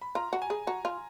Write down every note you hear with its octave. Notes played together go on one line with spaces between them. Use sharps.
B5
F4 A#5
F#4
G#5
G#4
F#4 A#5
F4